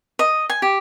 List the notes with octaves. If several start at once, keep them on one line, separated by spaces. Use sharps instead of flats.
D#5
G#5
G4